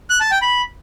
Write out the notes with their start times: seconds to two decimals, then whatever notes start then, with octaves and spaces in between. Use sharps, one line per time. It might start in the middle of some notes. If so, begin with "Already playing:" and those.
0.10 F#6
0.21 A5
0.31 G5
0.42 B5